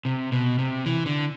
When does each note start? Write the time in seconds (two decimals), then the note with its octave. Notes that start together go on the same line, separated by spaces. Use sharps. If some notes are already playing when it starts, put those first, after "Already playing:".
0.05 C3
0.32 B2
0.59 C3
0.86 E3
1.06 D3